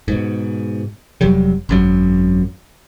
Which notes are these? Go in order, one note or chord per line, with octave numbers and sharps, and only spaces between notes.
G#2 B2
F1 F#3 G3
G#1 F#2 F#3